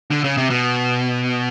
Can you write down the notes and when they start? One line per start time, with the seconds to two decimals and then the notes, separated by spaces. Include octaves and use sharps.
0.11 D3
0.24 C#3
0.37 C3
0.50 B2